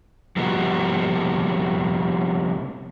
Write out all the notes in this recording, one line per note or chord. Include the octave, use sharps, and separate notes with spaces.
C3 F3 G3 A#3 B3 F#4